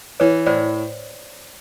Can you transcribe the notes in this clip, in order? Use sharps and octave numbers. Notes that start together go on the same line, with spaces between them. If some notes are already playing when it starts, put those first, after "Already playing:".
E3 B4 C#5
A2 C5 D5